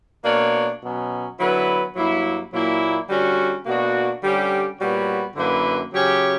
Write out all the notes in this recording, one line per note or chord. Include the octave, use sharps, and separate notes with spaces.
B2 A#3 D4 A#4 C#5
B2 F#3 C#4
D3 F#3 B3 E4 B4
G2 F#3 A#3 E4
A#2 F#3 A#3 E4
D3 G3 C#4 F#4
B2 A#3 D4 F#4
D3 G3 C#4 G4
A#2 G3 B3 F#4 C#5
F#2 D3 A#3 E4 B4
C#3 F#3 C#4 G4 C#5